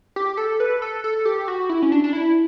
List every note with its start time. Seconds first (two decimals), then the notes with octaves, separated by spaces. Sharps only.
0.16 G4
0.37 A4
0.60 B4
0.82 A4
1.04 A4
1.25 G4
1.48 F#4
1.69 E4
1.82 C#4
1.92 D4
2.04 D4
2.13 E4